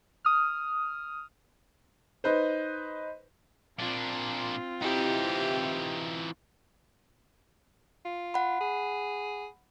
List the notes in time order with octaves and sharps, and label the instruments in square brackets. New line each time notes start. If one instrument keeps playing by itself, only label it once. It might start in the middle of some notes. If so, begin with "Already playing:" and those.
[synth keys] D#6 F6
[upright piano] D#4 B4 C5
[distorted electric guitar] A#2 D4 [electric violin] C4 F4
[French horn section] C3 E4 [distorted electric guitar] E3 D#4 [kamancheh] G4
[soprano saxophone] F4
[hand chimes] F#5 B5
[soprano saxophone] G#4